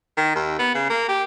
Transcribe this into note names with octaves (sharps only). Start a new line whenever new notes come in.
D#3
D#2
B3
C#3
A#3
G4